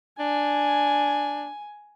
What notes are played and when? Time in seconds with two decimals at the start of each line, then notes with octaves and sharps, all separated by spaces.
0.19 D4 G#5